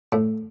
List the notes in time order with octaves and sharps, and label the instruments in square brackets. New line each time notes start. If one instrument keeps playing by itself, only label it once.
[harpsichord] A2